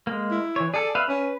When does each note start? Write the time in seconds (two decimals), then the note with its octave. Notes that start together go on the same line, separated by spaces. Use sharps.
0.07 G#3 A#3
0.31 E4
0.56 E3 C#5
0.74 G#4 A4 D5
0.95 B4 E5 F5
1.09 C#4 B4